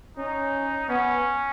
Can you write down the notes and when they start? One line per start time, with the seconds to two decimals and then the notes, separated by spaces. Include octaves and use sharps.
0.17 C#4 D#4
0.89 B3 C#4